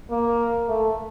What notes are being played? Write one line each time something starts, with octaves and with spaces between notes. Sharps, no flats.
A#3
A3